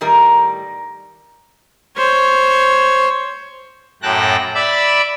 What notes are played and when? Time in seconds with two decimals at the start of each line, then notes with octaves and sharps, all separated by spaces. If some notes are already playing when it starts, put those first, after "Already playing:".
0.01 A2 D#3 G3 A#4
1.97 C5 C#5
4.02 F#2 A2 G5 A5 F#6 A#6
4.55 D5 E5 B5 D6 E6